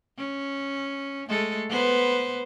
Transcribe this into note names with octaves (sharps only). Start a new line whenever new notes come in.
C#4
G#3 A3 A4
B3 B4 C5